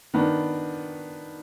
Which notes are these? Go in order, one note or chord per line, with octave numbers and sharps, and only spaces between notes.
D#3 B3 D4